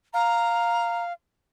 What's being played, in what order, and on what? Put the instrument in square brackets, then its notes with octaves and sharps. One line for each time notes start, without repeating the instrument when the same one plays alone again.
[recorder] F5 [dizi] A#5